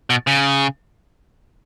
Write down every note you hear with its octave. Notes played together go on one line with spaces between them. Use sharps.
B2
C#3